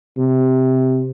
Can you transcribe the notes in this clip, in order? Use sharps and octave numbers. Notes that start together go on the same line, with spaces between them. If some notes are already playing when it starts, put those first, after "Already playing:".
C3